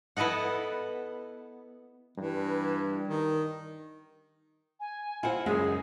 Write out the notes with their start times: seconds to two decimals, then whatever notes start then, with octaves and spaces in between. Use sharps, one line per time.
0.17 B3 E4 A4 D#5 F#5
2.18 G2 E3
3.08 D#3
4.80 G#5
5.23 C4 E4 F4 F#5
5.46 C#2 F#2 G#3 G#4 G#5